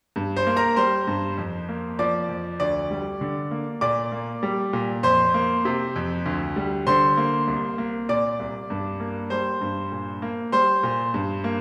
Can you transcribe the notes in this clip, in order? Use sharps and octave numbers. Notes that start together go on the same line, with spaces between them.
G2
C5 C6
A#3
A#4 A#5
G3 C5 C6
G2
F2
A#3
F3 D5 D6
F2
D2 D5 D6
G3
D3
A#3
A#2 D5 D6
A#3
G3
A#2
F2 C5 C6
A#3
C3
F2
D2
G3
D3 C5 C6
A#3
C2
A#3
A#2 D5 D6
C2
G2
A#3
G3 C5 C6
G2
A#2
A#3
G3 C5 C6
A#2
G2
A#3